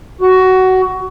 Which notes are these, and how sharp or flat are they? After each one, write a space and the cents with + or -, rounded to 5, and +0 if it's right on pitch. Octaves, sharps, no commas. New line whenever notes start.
F#4 +15